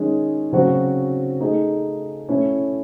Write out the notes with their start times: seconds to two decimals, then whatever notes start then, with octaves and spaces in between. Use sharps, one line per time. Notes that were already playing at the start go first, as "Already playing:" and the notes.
Already playing: D#3 G#3 C#4 G#4
0.52 C#3 F#3 C4 F#4
1.40 A3 D#4 G#4
2.29 A3 C#4 E4